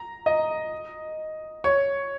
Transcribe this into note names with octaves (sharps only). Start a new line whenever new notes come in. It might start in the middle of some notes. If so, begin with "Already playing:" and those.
Already playing: A#5
D#5
C#5